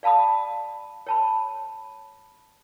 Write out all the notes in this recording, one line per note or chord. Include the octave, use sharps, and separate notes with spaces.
D5 F5 A5 B5 D#6
C#5 A5 B5